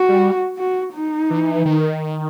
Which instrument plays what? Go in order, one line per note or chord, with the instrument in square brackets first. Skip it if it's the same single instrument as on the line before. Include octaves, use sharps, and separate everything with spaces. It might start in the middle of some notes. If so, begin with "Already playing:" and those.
Already playing: [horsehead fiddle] F#4
[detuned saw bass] G3
[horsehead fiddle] F#4
D#4
[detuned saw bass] E3
D#3